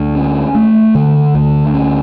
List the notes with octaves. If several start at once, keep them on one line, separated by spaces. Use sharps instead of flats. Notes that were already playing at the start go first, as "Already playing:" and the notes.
Already playing: D2
C#4
A3
D3
D2
C#4